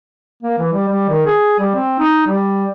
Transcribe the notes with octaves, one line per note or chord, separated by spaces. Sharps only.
A#3
E3
G3
G3
D#3
G#4
G3
C4
D#4
G3